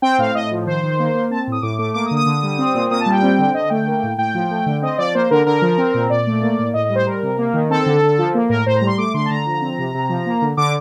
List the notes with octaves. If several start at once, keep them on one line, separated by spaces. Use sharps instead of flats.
C4 G5
A2 F5
A2 D#5
F3
D#3 C5
D#3
A#3
A#3
C4 A5
A2 D#6
A2 D6
A3 D6
A#3 D6
D#6
D3
D#6
D3
G3
C4
A#2
A#2 D#6
A5
G3
G5
C4
D3
D3 D#5
A3 G5
A#3
A2
A2 G5
F3
A3
D3
C4 D#5
F3 D5
A#3 C5
D3 A#4
D3 A#4
F3
C4
A#2
A#2 D5
A3
A#3
A2
A2 D#5
D#5
G3
C5
G3 A#4
C3
A#3
D#3
C4 A4
D3
D3
F3
A#3
A2 A#4
A2 C5
A#5
G3
C6
A3 D6
D3 C6
A5
D3 A#5
F3
C4
C3
C3
F3
A#3
D3
D3 D6